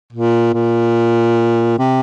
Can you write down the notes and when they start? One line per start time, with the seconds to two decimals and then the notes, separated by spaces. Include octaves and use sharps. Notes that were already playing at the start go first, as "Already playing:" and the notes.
0.13 A#2
0.54 A#2
1.79 C3